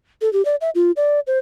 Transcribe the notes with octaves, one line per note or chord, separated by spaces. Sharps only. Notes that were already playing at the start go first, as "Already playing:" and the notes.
A4
G4
D5
E5
F4
D5
C5